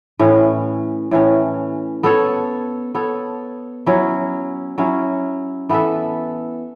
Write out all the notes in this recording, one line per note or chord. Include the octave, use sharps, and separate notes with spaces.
A2 E3 C#4
A2 E3 C#4
B3 A4 C#5
B3 A4 C#5
F#3 C#4 E4
F#3 C#4 E4
E3 B3 A4 E5